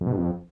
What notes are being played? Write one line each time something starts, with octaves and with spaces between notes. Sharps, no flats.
F2
B2
G2
F2